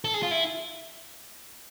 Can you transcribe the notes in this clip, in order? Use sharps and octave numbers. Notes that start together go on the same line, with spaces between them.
A4
G#4
F4
E4